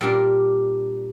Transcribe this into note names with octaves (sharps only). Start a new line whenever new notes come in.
A#2 G3 D4 G4 A#4